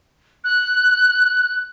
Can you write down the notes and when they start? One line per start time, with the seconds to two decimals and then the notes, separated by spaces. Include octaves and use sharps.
0.44 F#6